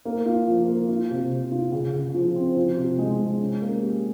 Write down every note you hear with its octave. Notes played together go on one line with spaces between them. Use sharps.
A#3
F4
F3
A#3
F4
C3
C3
F4
C#3
C#3
F3
C4
F3
C3
G#3
G#3
C#4
A#3
G4